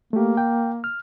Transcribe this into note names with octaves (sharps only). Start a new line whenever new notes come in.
A3 A#3 G4
G5
F6